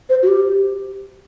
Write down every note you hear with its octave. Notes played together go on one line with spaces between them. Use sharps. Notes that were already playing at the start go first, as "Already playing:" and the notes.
C5
F#4
G4